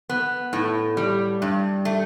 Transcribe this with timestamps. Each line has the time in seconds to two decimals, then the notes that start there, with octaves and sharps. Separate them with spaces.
0.09 B3
0.53 A2
0.97 G3
1.42 G2
1.85 A3